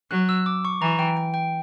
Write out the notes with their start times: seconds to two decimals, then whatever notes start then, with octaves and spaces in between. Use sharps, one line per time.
0.11 F#3 F#6
0.29 E6
0.46 D6
0.65 C#6
0.81 E3 A#5
0.99 G5
1.17 G5
1.34 G5